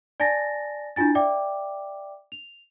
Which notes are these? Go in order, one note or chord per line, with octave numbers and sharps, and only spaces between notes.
D5 G#5 A5 A6 A#6
D4 E4 F4 G#5 A6
D5 E5 G5 D6
F7